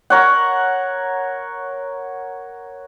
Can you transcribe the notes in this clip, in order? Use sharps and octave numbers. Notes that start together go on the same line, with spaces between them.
A#4 C#5 F#5